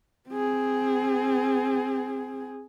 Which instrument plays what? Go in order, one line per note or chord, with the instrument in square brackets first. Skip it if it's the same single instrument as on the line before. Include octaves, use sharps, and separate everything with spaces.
[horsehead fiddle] C4 G#4